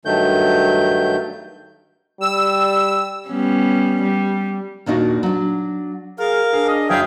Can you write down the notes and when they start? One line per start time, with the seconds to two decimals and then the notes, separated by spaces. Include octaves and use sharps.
0.05 G2 D#3 F#3 A3 G6
2.21 G3 E6
3.27 G3 B3 C#4
4.02 G3
4.86 D#2 A#2 D4 D#4 F#4 F#5
5.23 F#3 D4
6.19 G#4 A#4 F5
6.53 D4 G#4
6.67 D#5
6.90 F#1 F#2 G#4 E5 F5 G5 G#5